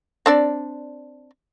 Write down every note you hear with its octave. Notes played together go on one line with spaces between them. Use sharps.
C4 D4 D5